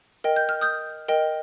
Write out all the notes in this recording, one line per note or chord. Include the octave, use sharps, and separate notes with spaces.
A#4 D#5 G5
G6
F6
D#6 G6
A#4 D#5 G5